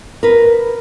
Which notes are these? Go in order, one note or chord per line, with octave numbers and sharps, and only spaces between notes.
A#4 B4